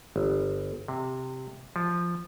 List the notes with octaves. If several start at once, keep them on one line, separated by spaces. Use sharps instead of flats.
G1
C3
F3